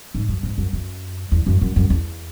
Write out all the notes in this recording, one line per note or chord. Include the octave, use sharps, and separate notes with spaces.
G#2
F#2
G#2
F#2
F#2
E2
F#2
F#2
F#2
E2